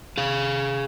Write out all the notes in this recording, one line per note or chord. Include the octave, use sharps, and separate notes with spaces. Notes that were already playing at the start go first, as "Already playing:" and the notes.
G#4 F5